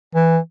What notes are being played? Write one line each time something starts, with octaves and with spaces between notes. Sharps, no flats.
E3